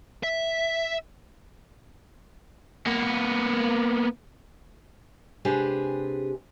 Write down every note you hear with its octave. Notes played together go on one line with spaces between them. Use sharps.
E5
A#3 B3
C3 G#3 D4 G4 G#4 B4